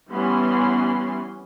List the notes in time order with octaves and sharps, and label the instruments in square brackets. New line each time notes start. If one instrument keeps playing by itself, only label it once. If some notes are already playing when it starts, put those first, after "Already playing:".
[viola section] E3 G3 B3 C#4 C6